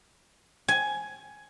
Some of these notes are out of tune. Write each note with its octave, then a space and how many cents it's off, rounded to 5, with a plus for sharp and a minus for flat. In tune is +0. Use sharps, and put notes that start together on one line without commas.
G#5 +10